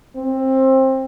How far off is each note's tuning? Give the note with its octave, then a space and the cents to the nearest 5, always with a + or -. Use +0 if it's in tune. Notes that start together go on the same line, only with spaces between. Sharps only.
C4 +20